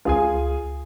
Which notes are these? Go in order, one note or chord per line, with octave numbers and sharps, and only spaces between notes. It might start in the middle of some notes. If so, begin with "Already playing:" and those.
C#2 F4 G#4 G#5